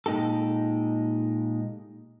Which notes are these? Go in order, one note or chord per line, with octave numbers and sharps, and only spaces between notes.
A#2 G#3 D#4 G4 A4